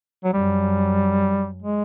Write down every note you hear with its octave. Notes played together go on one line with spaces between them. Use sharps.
F#3
F#2 G3
G#3